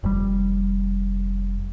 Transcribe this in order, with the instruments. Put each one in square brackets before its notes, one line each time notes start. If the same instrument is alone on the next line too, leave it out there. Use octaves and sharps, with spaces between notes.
[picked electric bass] F1 G3